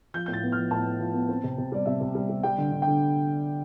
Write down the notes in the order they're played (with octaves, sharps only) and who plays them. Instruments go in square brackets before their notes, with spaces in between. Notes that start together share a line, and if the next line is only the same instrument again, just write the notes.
[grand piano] F3 G6
A2 G6
A6
B3
F6
F3
A2 A5
B3
F3
B3
C4
C3
C3
G3 D5
C3 E5
C3
G3
G3
G3 G5
D3
D3
D3 G5